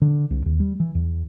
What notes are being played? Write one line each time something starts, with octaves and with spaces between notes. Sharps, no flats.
D3
C2
D#2
G3
E3
E2